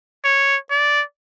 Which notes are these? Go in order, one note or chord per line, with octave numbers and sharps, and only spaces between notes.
C#5
D5